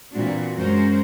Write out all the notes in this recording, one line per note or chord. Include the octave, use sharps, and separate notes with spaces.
A#2 E3 C4 D4 F#4
F#2 G#3 C#4 F#4 A#4 C5